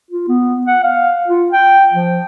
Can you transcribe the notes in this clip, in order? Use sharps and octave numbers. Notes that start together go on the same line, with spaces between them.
F4
B3
F#5
F5
F4
G5
F3